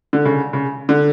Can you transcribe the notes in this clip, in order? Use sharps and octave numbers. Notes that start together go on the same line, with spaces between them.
D3
C#3
C#3
D3